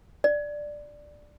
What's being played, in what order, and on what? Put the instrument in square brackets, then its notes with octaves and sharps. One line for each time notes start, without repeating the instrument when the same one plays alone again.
[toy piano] D5